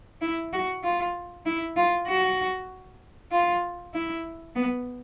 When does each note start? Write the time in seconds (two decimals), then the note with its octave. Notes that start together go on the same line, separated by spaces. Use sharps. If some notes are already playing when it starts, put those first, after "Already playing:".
0.22 E4
0.53 F#4
0.84 F4
1.46 E4
1.77 F4
2.08 F#4
3.32 F4
3.94 E4
4.55 B3